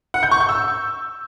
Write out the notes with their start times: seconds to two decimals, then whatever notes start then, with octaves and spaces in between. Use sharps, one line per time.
0.14 F#5
0.23 G6
0.31 C#6
0.40 G6
0.49 E6